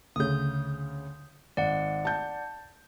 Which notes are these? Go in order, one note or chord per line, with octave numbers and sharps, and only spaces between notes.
D2 C#3 D#6 G6
G#1 D5 F#5
A5 G6